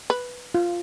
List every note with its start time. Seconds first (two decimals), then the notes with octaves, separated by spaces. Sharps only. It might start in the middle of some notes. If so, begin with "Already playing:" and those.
0.10 B4
0.55 F4